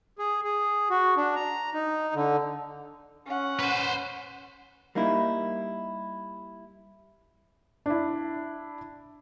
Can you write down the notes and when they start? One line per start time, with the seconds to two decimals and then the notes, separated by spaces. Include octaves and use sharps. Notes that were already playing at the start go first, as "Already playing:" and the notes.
0.18 G#4
0.44 G#4
0.90 F#4
1.17 D4
1.36 A#5
1.73 D#4
2.15 D3
3.26 C#4 F#5
3.60 B4 C5
4.95 G3 A#3 D#4 E4
7.86 D4 E4